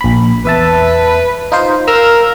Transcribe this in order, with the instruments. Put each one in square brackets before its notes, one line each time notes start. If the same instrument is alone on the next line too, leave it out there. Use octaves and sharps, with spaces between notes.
[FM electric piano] A#1 B5
[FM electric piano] E2 E5 A5 [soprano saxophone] B4
[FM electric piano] D#4 F4 C5
[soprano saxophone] A#4 [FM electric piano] F5 E6 F6